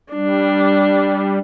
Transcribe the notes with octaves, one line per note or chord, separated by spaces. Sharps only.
G3 D4